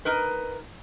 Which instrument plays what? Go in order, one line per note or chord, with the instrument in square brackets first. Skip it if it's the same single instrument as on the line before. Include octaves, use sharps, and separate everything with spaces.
[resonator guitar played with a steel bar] D#4 A#4 B4